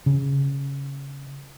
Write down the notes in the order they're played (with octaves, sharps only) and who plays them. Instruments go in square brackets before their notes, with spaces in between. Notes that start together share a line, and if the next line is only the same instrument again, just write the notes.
[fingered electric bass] C#3